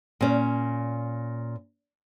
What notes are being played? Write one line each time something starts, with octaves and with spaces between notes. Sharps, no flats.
A#2 C#4